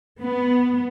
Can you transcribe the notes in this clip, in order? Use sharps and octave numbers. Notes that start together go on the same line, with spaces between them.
B3